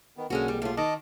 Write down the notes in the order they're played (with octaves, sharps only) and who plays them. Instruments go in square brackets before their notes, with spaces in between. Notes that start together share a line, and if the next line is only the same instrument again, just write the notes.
[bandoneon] D#3 B3
[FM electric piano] B1 A#3 G#4 [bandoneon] D3 [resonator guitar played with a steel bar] G#3 C#4 F#4
[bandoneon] F2 [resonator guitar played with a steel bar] G3
[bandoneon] A2 A3 [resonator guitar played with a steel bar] G3 F4
[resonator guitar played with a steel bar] D#3 [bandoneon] D#5 A5 D6